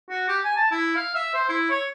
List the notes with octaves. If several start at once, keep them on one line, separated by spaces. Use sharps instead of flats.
F#4
G4
G#5
A5
E4
F5
E5
C5
E4
C#5